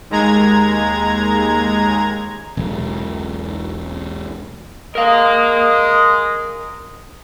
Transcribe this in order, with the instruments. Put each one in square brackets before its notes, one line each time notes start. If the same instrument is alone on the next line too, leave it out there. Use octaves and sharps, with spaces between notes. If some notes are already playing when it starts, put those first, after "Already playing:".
[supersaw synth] D#2 G#3 A#5 G#6
[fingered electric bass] E1 B1
[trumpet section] G#3 D#5 [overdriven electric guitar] A#4 F5